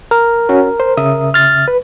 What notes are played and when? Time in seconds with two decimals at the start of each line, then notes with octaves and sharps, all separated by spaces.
0.11 A#4
0.49 C#4 F#4
0.80 C5
0.97 C#3 E5 D#6
1.34 F6 A6
1.68 B4